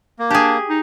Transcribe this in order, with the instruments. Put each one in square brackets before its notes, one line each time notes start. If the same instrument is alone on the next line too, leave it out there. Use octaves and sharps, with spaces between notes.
[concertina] A#3
[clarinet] D4 [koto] G4 G#4
[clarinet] D#4